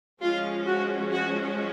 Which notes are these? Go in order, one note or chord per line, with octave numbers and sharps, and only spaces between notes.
F3 G#3 C#4 F4
F#4
F#4